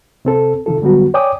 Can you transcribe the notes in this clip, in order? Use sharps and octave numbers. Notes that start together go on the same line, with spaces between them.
C3 C4 A4
C3 D#3 F3 F4 A4
D3 F#3 G3 B3 F#4
C#5 D5 G5 G#5 D6 D#6